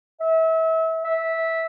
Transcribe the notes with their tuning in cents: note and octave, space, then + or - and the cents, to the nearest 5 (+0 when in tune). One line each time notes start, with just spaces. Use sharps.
E5 -30
E5 -10